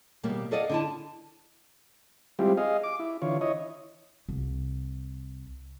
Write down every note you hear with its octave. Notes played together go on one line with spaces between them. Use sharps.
D#2 B2 G3 A#3
G#4 A4 D5 D#5 F5 F#5
D3 E4 A5
G3 G#3 C4 E4 F4 G4
G#4 D#5 F5
D6
E4
D3 E3 F4 C#5
E4 C#5 D#5
C2